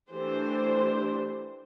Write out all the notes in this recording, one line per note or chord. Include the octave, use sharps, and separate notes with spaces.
E3 A3 D4 G4 C5